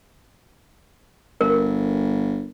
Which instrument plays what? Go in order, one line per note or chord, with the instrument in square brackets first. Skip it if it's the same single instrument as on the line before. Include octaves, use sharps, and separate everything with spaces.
[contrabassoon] G1 [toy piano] A#4